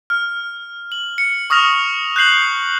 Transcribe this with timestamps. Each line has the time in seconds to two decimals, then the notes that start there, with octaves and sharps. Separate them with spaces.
0.10 F6
0.92 F#7
1.18 C#7
1.50 C#6 D#6 F6 A#6 F7
2.16 F#6 G6 C7 F#7